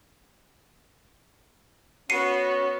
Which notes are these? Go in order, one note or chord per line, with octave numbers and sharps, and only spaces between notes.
B3 C#4 F#4 C7 C#7 D#7